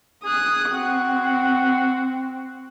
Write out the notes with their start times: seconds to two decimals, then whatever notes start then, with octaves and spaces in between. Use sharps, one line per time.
0.25 G#4 D#6 F#6
0.73 C4 F#4